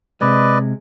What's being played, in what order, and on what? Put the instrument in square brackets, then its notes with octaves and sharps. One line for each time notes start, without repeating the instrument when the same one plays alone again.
[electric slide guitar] C3 G#3 [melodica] B4 D5 D#5